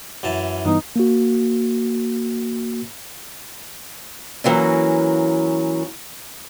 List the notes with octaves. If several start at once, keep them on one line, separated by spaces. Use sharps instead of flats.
F#2 E3 A5
G2 E3 B3 D#4
A#3 F#4
E3 F#3 A#3 C#4